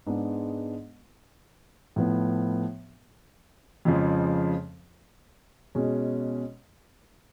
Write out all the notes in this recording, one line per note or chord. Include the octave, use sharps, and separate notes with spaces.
G#2 G#3 B3 D4
A2 F3 B3
F2 C#3 F3 G#3
B2 G#3 C#4